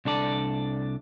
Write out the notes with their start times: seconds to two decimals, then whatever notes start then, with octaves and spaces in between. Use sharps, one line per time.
0.05 C2 D4 A4 D5